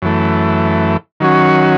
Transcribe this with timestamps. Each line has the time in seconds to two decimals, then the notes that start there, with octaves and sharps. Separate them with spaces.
0.02 F#2 E3 A3
1.20 D#3 F#3 C#4 F#4